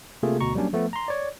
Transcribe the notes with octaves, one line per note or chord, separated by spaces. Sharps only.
C3 A3 A#3 F4 G#4
D2 B2 A#5 C#6
F#3 G3 A#3 C#4 D4
F3 A3 B3
A#5 C6
C#5 D5